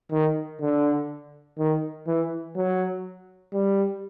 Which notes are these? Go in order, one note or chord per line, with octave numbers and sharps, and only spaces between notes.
D#3
D3
D#3
E3
F#3
G3